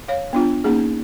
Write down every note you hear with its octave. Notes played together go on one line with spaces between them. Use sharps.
C#5 F5
B3 D4 F4
A#3 C#4 D#4 G#4